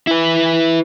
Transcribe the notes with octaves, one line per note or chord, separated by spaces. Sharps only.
E4 B4